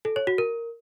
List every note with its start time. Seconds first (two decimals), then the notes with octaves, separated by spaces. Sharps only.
0.05 A4
0.16 C#5
0.27 F#4
0.38 A#4